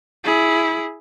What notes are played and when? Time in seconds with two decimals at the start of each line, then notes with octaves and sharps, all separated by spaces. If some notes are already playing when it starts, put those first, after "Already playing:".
0.24 E4 G#4